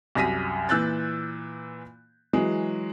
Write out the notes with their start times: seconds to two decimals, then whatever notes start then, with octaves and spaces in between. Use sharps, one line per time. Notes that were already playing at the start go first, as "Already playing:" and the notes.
0.15 C2 F#2 A#6 B6 D#7
0.69 A#2 E3 E6 F#6 G6 A6
2.33 E3 F#3 G#3